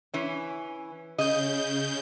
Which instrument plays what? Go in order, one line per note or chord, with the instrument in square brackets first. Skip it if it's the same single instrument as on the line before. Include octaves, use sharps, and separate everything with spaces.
[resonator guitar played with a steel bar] E3 C#4
[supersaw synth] C#3 G6 [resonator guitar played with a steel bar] D#5